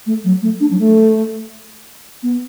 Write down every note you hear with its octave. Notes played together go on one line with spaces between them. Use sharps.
A3
F#3
A3
D4
F#3
A3
B3